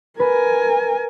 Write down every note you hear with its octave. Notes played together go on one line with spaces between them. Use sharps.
A#4 B4 G#5